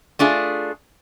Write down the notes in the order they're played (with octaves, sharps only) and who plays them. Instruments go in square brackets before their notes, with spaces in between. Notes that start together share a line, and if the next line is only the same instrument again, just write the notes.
[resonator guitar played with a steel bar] A3 D4 F4 G#4